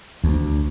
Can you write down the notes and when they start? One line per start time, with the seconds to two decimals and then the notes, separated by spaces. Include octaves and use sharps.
0.24 D2